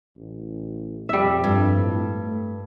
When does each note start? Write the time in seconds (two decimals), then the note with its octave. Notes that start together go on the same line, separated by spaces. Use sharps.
0.17 A1
1.09 F2 G3 E5
1.44 G2
1.77 A2
2.11 A3